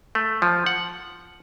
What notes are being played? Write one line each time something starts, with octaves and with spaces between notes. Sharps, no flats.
A3
F3
F#5